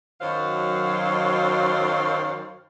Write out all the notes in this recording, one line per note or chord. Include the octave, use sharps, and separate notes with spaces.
F#2 D#3 F#3 C5 F5